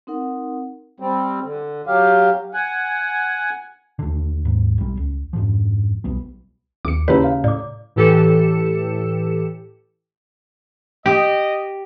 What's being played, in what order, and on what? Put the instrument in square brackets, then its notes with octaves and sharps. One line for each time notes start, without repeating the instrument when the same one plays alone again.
[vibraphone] C4 D#4 A#4 F#5
[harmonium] G3 C4
D3
F#3 G4 F5
F#5 G#5
[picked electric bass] D#2 D3
D#2 G#2
B1 G3
C#2
F2 G#2 F3
B1 G3 B3
[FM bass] D#2 [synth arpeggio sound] D6 C#7
[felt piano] D#2 [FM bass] C#3 [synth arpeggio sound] E4 B4 [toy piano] C#5 A5 A#5
[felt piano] F5
[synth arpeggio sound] A2 [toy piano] D5 D6
[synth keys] A2 E3 G4 A4 C#7 E7
[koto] G4 [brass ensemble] D#5